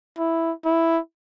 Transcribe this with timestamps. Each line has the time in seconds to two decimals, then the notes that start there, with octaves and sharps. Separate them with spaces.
0.19 E4
0.65 E4